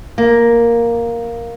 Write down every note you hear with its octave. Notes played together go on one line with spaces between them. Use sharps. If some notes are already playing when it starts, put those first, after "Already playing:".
A#3